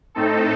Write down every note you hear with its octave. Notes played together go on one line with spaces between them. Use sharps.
A2 A3 C4 D#4 A4